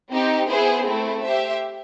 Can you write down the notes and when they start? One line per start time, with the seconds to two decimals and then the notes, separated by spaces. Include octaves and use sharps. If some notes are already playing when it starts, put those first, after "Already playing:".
0.11 C4 D#4 G4
0.49 B3 E4 G#4 C5
0.85 A3 C4 E4
1.22 G4 C5 E5